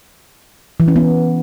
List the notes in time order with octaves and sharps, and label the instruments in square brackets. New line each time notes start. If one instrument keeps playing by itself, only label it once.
[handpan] E3
C#4
B3